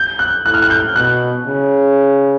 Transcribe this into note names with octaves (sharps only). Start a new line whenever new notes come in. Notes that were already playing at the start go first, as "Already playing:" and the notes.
Already playing: G6
F#6
A2 F#6
F6
F#6
G6
B2 F#6
C#3